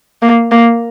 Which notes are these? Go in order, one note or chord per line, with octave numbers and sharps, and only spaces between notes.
A#3
A#3